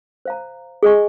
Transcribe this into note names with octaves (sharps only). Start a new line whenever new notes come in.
C5 F5 A#5
G#4 D#5 G#5 C#6